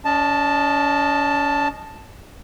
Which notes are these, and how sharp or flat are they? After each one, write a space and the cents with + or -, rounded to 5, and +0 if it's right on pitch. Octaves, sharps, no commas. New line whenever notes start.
C#4 +35 D#5 -15 A5 +0